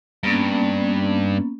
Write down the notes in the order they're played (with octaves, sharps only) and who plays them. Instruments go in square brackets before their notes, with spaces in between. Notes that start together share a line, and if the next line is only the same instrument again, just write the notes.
[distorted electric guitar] G2 [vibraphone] A#3 B3 C#4